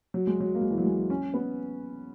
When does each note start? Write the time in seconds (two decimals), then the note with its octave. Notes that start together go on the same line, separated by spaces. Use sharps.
0.14 F#3
0.27 G#3
0.40 F#3
0.55 A#3
0.62 G#3
0.71 E3
0.78 F#3
0.86 G#3
1.10 C#4
1.34 B3